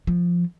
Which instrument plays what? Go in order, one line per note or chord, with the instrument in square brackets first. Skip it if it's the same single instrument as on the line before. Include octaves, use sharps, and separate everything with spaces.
[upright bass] F3